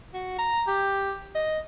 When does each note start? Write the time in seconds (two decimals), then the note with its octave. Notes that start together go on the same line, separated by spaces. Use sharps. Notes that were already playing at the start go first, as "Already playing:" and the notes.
0.14 F#4
0.39 A#5
0.67 G4
1.35 D#5